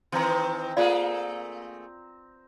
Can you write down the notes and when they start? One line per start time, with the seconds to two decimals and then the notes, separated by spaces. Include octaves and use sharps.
0.12 D#3 E3 C4 A#5
0.77 A3 A#3 F4 G#4 D5 F5